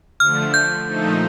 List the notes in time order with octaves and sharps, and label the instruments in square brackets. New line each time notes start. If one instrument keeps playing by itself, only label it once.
[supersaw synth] D3 F3 A3 [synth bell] F6
[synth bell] G6
[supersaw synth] A#2 F3 A3 D#4